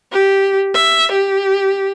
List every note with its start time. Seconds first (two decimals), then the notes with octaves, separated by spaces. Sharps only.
0.12 G4
0.74 E5
1.12 G4